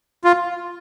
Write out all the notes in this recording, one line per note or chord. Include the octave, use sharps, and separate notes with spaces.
F4